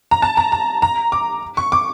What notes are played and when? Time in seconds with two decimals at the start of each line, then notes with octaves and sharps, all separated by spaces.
0.11 A#5
0.22 A5
0.37 A#5
0.52 A#5
0.82 A#5
1.12 D6
1.57 C#6
1.72 D6